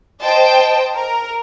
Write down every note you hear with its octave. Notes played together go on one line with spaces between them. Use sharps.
C5 D#5 G5 A5
A#4